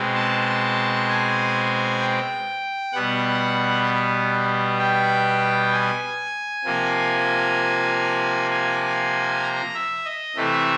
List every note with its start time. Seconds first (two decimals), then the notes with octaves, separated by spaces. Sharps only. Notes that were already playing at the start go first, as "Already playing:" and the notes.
Already playing: B2 G#3 C4
0.15 A5
1.08 G#5
2.00 G5
2.93 B2 G3 B3 F#5
4.78 G5
5.72 G#5
6.64 C3 F3 A#3
8.51 G#5
9.43 A#5
9.74 E5
10.05 D#5
10.36 C3 E3 A3 E5